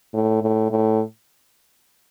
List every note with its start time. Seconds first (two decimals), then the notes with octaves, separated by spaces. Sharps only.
0.14 A2
0.43 A2
0.71 A2